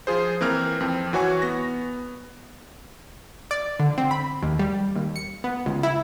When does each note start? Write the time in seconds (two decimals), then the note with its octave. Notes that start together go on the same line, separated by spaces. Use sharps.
0.07 F3 F4 G#4 C5
0.41 E3 A#3 C4 A#4 F6
0.80 F2 C4
1.13 E3 F#4 C#5 G#5 C#6
1.42 B3 A#6
3.51 D5
3.80 D3
3.98 C4
4.11 B5
4.43 D#2
4.59 G3
4.96 D#2
5.16 C#7
5.44 B3
5.66 C#2
5.83 E4